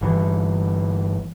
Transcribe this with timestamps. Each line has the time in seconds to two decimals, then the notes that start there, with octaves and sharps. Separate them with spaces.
0.01 G1 E3